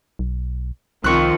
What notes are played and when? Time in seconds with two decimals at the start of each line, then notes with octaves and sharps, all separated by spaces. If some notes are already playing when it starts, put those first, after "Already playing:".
0.19 B1
1.04 C2 D#3 F3 C4 F4 C#6 F#6